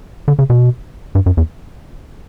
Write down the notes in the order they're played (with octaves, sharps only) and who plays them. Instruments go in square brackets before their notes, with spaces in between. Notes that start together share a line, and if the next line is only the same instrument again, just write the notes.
[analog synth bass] D3
C#3
B2
G2
F#2
E2